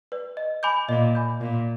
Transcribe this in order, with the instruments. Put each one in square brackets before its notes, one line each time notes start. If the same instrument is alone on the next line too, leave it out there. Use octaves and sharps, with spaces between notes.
[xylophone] B4 D5
D#5
G#5 B5 D6 G6
[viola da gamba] A#2 [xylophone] D#5
[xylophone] G#5 B5 D6 G6
[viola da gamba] A#2 [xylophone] D5